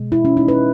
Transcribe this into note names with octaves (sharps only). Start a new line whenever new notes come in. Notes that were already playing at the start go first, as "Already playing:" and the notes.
Already playing: B2 G#3
E4
C#4
D#4
B4